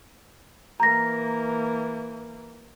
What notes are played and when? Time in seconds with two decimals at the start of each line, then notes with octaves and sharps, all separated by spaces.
0.80 E3 A#3 A#5 A#6